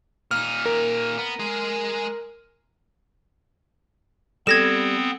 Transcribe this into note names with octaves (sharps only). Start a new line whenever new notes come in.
A#2 D#4 F6
A#4
B3
G#3 G#4
G3 B3 C4 A4 G#6 A#6 E7